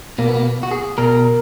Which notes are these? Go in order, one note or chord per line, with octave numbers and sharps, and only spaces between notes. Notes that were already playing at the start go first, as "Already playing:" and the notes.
B2 A#3
B3
A#3
F#4
G#4
B2 A#4